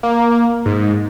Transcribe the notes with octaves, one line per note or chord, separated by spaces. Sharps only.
A#3
G#2